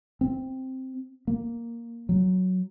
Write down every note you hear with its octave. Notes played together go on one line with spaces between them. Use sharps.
C4
A#3
F#3